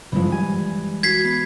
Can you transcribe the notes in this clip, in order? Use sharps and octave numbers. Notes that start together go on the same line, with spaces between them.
F#1 G2 E3 F3 G#3
G3 G#5
F#4 G#6 B6 C7
B3